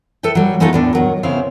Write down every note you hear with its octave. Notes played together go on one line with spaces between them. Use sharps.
A4 B4 E5 G5
F#3 G3
G#3 A3 B3 D#4 F4 A4
E2 A2 D4
D#3 F#3 A#4
C#3 B3 C4 E4 F5